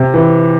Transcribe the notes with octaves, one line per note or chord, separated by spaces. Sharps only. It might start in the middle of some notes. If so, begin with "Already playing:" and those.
Already playing: C3
E3